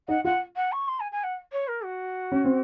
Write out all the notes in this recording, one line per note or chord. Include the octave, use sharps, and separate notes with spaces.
D#4 F#5
F4 F#5
F#5
C#6
C6
G#5
G#5
F#5
C#5
A#4
F#4
C#4
C4